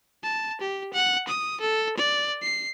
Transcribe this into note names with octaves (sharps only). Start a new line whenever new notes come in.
A5
G4
F#5
D#6
A4
D5
C7